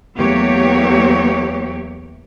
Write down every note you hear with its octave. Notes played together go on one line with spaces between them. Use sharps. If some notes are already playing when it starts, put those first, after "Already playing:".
E2 F#3 A3 A#3 G4 C#5